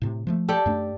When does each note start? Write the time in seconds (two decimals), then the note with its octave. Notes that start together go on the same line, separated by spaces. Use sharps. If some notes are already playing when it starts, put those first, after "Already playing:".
0.02 A2 C3
0.27 F3 G#3 A3
0.49 G4 A4 D5
0.66 F#2 A3 D4